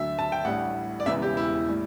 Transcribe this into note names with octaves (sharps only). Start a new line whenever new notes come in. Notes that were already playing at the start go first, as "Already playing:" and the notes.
Already playing: D2 D3 F#3 E5
A5
G5
A1 A2 G3 D4 F#5
D5
E1 E2 C#3 E3 B3 E5
G4
E4
A2 G3